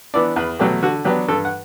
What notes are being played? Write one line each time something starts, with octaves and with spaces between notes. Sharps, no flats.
E3 B3 D4 D5
E2 B4
B2 F#3 A3 G4
D3 F#4
F#3 B3 D4 G4
G2 A4
F#5